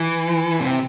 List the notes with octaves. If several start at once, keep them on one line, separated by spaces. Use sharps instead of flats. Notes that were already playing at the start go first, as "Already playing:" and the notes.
Already playing: E3
C3